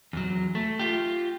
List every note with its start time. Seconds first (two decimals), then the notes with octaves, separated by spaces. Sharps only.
0.13 E2 F#3
0.55 A3
0.79 F4 G4